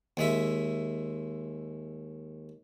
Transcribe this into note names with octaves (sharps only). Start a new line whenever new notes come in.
D#2 G#3 E5